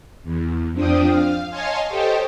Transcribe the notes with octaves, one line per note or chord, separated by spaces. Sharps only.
E2
F2 F3 C4 D4 G5 D#6
F5
C#5 D#5 F5 G#5 A5 C6
G4 A4 C5 C#5 D#5 G5